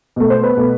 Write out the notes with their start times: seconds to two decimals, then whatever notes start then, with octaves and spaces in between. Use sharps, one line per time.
0.16 B2 A3
0.30 C5
0.44 B4
0.57 B2 A3